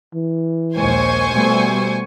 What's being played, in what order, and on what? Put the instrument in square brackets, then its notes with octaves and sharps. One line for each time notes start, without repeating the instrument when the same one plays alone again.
[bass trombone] E3
[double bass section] A#1 D#2 G#3 [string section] C5 G#5 C#6
[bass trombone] B2 [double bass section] G3 A3 B3